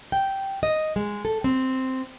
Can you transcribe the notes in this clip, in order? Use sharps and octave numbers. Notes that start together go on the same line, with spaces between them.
G5
D#5
G#3
A4
C4